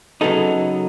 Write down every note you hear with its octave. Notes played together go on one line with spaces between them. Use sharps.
C#3 F#3 B3 D#4 A4